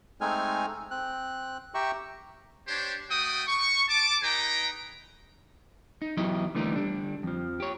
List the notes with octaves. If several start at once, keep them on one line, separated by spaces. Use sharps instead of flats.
G#3 A3 C4 D#4 G#5 F6
C4 F#6
G4 E5 G5 A#5 C#6 E6
D4 G4 C5 C#5
A3 F#4 G5 D#6
C#6
A5 D6
D#4 G#4 B4 G5 A#5
D#4
E2 F#3 E4 G4 D#5
D3 E3 G3 A3 A#3 D#4
D3 G3 D4
F2 F3
G4 C#5